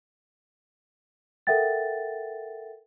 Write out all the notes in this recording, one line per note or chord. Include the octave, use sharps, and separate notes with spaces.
A4 A#4 E5 F#5 G5 A6